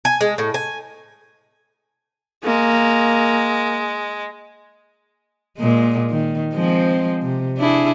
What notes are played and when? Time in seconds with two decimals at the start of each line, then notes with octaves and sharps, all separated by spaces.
0.05 G#5
0.21 G#3
0.38 A2
0.54 G#5
2.45 G#3 A#3
5.58 A#2 G#3
6.10 D#3
6.54 F3 G#3 C4
7.23 C3
7.58 D4 E4 G#4